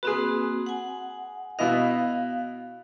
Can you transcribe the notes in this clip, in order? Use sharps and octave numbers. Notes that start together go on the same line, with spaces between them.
A#3 C4 F#4 G#4 B4
F#5 G#5
B2 E4 D#5 F5